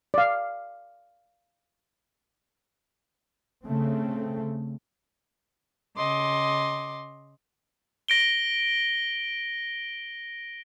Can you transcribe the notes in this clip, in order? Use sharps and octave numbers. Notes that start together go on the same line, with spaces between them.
D5 F5
C#3 A3 C4
C#3 D#5 C6 D6
A#6 D7 G7